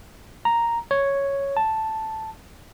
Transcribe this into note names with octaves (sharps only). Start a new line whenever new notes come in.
A#5
C#5
A5